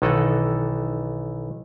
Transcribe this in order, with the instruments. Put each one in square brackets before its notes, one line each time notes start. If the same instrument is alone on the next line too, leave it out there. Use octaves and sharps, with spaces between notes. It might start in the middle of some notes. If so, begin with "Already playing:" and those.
[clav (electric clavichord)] B1 D#3 E3 A4 D#5 F#5